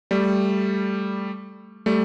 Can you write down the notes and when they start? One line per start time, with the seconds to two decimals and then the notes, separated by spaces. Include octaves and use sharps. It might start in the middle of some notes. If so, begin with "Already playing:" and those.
0.11 G3 A3
1.86 G3 A3